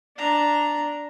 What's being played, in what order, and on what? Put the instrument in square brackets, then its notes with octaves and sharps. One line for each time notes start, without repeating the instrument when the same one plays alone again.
[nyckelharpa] D4 A#5